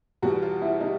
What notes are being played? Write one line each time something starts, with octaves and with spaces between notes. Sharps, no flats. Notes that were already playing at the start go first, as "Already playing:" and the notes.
E2 B2 G3 F#4
F4
E4
B2 G3 D#4